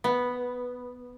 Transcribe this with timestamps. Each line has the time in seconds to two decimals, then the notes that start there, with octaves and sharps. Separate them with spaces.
0.04 B3